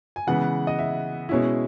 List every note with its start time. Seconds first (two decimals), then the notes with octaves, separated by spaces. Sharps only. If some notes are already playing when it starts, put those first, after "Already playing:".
0.16 G#5
0.27 C#3 E3 G#3 B3 F#5
0.67 D#5
0.79 E5
1.29 B2 G#3 C#4 E4